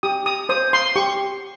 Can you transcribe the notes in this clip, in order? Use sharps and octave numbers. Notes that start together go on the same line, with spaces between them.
G4 D#6
D#6
C5 D#6
C6
G4 C#6